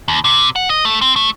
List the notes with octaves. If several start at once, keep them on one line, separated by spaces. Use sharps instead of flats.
D#2
C3
F#5
D#5
A3
C4
A3